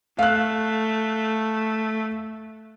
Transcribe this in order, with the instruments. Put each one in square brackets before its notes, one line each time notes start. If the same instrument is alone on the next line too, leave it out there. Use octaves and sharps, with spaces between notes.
[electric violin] A3 [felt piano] F5 F#6